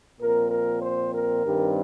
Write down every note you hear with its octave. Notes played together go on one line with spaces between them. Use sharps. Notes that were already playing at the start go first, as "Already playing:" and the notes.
A#2 F3 C4 A#4
A#4
C5
A#4
G2 D#3 G3 C4